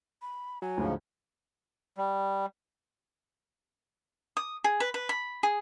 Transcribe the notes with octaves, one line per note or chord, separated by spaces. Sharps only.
B5
F#3 G#5
D2 G#2 C#3 F3
G3
D#6
G#4
B4
B4
B5
G#4